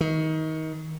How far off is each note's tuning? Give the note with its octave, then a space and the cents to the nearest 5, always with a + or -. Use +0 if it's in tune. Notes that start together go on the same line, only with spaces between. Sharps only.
D#3 +25